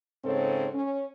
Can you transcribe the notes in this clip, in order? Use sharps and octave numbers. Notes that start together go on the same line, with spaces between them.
G#2 C#3 C4 A4 C#5
C#4